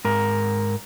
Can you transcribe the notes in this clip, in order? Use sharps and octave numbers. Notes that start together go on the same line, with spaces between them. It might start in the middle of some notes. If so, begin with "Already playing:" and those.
G#2 A#4